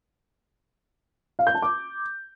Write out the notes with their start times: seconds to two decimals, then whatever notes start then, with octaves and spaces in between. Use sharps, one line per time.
1.39 F5
1.47 G6
1.55 A5
1.62 D6